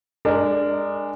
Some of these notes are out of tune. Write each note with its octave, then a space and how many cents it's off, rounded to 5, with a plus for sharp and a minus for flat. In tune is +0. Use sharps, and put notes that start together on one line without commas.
G#3 -15 D4 +0 A#4 -10